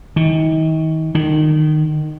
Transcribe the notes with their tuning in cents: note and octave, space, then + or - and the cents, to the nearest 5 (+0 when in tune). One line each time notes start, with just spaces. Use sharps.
D#3 +35
D#3 -20